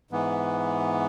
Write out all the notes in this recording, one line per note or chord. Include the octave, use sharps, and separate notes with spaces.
G#2 E3 B3